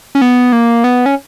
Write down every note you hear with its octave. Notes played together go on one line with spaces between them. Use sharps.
C#4
B3
A#3
B3
C#4